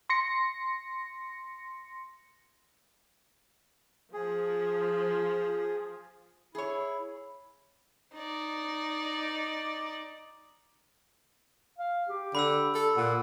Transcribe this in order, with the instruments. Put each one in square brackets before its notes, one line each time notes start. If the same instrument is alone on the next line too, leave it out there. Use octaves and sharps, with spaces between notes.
[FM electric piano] C6 A#6 C#7
[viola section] F3 [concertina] G#4
[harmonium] E4 [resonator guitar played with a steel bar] G#4 C#5
[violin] D#4 D5
[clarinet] F5
G4
[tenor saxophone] D3 [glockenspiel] B5 E6
[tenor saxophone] A4
[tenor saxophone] A#2 [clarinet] F#5